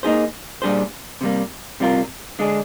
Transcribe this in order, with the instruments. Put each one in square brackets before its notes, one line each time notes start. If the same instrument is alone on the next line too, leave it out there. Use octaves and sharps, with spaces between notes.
[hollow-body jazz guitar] A#3 D#4 G#4 C5
A#2 G3 D4 G#4 C5
C3 G3 A#3
C3 G3 C4 F4 A#4
D3 G#3 D4 G#4